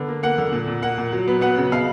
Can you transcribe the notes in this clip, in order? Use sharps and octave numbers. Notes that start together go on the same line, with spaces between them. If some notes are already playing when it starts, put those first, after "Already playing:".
Already playing: D3 B3
A#3
A#3 F#5
D3
A#2
A#2
A#3 F#5
A#2
F#3
B3
B3 F#5
C#3
B2 F5